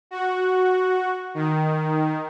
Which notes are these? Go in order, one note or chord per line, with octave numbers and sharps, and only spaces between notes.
F#4
D#3